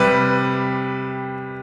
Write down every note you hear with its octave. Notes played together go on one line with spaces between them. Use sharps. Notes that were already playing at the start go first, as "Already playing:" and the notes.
Already playing: C3 G3 B4